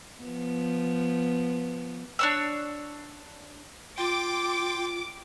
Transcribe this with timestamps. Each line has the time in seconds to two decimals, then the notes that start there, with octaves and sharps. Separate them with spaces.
0.22 F3 B3
2.19 D4 C#5 E6
3.98 F4 G5 C6 D6